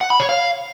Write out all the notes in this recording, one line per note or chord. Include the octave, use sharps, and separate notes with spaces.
F#5
B5
C#5
F5